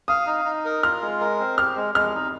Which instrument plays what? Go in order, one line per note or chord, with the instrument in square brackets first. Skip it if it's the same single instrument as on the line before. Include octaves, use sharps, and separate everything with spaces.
[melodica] F5 [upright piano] D#6
[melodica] D#4
D#4
A#4
[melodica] F4 [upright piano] F6
[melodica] G#3
A#4
C4
[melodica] G4 [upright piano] F6
[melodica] G#3
[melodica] G#3 [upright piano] F6
[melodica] D#4